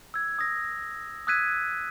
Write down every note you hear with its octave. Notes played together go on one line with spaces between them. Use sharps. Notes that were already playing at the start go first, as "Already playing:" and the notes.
E6 G#6
D#6 A#6
D#6 E6 F#6 G#6 B6 D#7